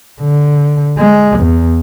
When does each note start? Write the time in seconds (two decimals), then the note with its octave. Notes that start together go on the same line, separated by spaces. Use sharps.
0.21 D3
0.98 G#3
1.39 E2